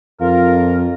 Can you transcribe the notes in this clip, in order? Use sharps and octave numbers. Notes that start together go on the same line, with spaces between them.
F2 F4 A#4